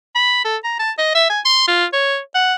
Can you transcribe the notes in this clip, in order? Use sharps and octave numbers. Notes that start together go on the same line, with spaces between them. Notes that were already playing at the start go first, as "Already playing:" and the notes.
B5
A4
A#5
A5
D#5
E5
G#5
C6
F4
C#5
F#5